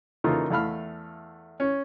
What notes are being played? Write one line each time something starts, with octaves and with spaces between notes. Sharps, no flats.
C#3 E3 A#3 D#4 F4 A4
E2 A3 F5 B5 F6
C#4